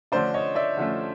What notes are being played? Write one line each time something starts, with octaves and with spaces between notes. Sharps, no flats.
D3 F3 A3 C#4 C5 D5
C#5 D#5
D5 E5
D3 F3 A3 C#4